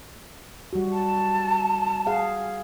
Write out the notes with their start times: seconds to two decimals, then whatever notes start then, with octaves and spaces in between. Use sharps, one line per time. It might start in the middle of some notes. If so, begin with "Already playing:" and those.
0.73 G3 F#4
0.92 A5
2.06 G#4 F5 F#5